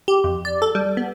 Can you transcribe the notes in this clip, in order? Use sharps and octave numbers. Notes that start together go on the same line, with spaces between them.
G4
F2
D5
A4
G3
B3